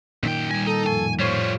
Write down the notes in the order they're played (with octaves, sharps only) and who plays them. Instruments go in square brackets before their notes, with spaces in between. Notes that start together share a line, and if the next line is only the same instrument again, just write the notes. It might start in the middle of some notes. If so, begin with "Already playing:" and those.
[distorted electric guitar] F#2 G5 [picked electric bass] A#2 D#3
[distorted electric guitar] D#2 G#5 [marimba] G3
[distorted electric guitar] D#4 [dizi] A4
[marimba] F2 A2 F3 [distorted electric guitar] G#5
[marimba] A2 C5 G#6 [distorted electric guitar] G3 F4 [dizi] C#5